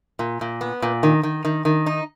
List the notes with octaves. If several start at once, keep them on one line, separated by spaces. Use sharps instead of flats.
A#2
A#2
B3
A#2
D#3
D#3
D#3
D#3
D#4